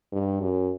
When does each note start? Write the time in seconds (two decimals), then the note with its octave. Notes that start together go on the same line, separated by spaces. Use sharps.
0.12 G2
0.41 F#2